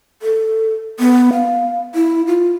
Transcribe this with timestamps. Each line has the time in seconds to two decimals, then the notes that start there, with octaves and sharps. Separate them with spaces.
0.22 A4
1.00 B3
1.33 F5
1.95 E4
2.27 F4